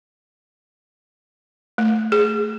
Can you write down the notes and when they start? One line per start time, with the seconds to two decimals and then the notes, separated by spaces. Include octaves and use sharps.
1.78 A3
2.12 G#4